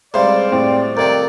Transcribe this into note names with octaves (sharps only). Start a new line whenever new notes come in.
C#2 C3 G3 C5 D5 F5
A2 C4
F2 C3 D#3 A#4 D5